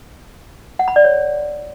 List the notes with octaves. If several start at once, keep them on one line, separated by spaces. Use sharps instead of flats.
F#5
B5
D5
C#5